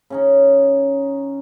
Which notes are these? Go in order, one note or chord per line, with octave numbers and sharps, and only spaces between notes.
C#3 C#4 D#4